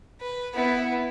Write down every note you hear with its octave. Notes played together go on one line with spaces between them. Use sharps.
B4
B3 E4